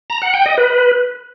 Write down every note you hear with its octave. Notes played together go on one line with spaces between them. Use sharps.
A#5
F#5
G5
D#5
B4